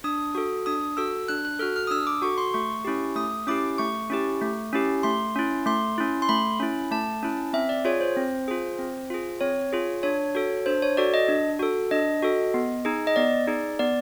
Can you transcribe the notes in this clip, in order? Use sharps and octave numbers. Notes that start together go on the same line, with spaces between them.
D4 D#6
F#4 A4
D4 D#6
F#4 A4 E6
D4 F#6
F#6
F#4 A4 F6
F6
D#6
D4 E6
D6
F#4 A4 C#6
C6
A3 C#6
C#4 E4 G4
A3 D#6
C#4 E4 G4 D6
A3 C#6
C#4 E4 G4
A3
C#4 E4 G4
A3 C6
C#4 E4
A3 C6
C#4 E4
C6
A3 B5
C#4 E4
A3 A5
C#4 E4
C4 E5
D5
F4 G#4 C#5
C5
C4
F4 G#4
C4
F4 G#4
C4 C#5
F4 G#4
D4 C#5
F#4 A4
D4 C5
C#5
F#4 A4 D5
D#5
D4
F#4 A4
D4 D#5
F#4 A4
B3
D#4 G#4
D#5
B3 D5
D#4 G#4
B3 D5